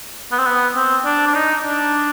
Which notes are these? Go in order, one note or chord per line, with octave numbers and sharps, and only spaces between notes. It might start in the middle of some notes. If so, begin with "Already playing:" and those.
B3
C4
B3
C4
D4
D4
D#4
D4